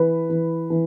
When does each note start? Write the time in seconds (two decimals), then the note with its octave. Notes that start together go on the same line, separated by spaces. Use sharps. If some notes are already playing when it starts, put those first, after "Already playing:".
Already playing: E3 B4
0.30 E3
0.70 E3